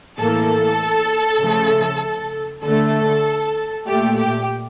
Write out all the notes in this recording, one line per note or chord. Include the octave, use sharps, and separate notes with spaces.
A2 E3 A#3 A4
C#3 F3 A3
D3 A3 A4
A#2 A3 G4
G4